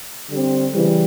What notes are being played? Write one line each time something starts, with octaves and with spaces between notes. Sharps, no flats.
D3 G3 C4
C#3 E3 G3